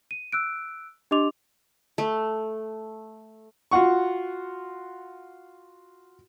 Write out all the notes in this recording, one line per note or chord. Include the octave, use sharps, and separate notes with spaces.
D#7
E6 F#6 D7
D4 G4 D#5 C6 D6 F7
A3
F4 F#4 F#5 C#6